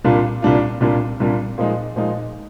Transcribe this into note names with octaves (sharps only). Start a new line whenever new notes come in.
C2 A#2 G3 D4 F4
C2 A#2 G3 D4 F4
C2 A#2 G3 D4 F4
C2 A#2 G3 D4 F4
A#2 F3 G#3 D#4
A#2 F3 G#3 D#4